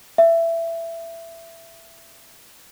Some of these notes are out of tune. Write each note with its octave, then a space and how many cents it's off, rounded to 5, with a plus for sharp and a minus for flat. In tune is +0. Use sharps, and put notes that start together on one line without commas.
E5 +15